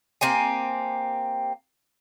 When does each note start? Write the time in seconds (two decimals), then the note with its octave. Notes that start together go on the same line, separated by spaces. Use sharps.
0.21 A#3 C4 G4 G#5